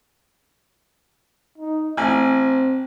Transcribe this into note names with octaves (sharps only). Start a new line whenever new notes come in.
D#4
A1 C4 G#5